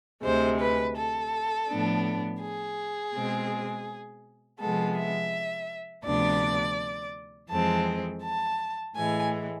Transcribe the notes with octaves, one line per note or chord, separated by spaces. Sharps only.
D2 C3 G#3 C5
B4
A4
A2 F3 B3 D4
G#4
B2 G#3 C4
C3 F3 G#3 B3 A4
E5
D2 C3 F3 B3 D4 D5
F2 E3 G#3 C4 A5
A5
A2 E3 G#3 G#5